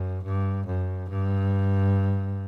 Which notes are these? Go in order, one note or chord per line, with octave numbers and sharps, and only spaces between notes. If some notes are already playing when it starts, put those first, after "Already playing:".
Already playing: F#2
G2
F#2
G2